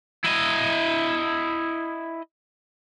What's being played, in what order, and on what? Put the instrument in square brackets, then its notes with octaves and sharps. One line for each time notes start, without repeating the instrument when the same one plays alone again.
[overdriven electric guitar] E4 D#5